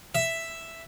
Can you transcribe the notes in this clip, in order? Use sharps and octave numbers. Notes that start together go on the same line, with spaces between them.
E5